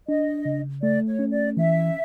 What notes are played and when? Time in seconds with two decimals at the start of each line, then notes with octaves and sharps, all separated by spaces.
0.08 D4 D#5
0.45 C#3
0.82 A3 D5
1.07 C#5
1.19 C#4
1.32 D5
1.57 E3 E5